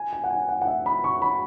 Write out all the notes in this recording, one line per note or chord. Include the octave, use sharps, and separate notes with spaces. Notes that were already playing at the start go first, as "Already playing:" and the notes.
Already playing: G#5
G#5
F#5
G#5
F#5
F#5
E5
B5
C#6
B5